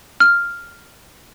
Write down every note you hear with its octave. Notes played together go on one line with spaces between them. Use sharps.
F6